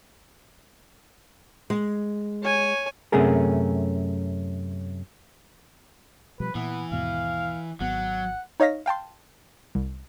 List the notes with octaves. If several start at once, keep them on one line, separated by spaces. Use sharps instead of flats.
G#3
C#5 G#5
F#2 C3 A3 C#4 G#4 A#4
B2 F3 G3 B4
A#2 E3 B3
D#2 G#2 B2 F5
G#1 F#3 B3 F#5
D#4 C#5 D#5 F5 A#6 B6
F5 G5 A5 C6
C2